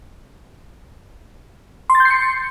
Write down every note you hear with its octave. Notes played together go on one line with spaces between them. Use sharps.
C6
A6
G6
C7
C#7